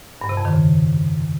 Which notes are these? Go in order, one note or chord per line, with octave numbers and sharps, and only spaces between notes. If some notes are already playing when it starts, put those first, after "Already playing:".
G2
C3
F2
D#3
C#3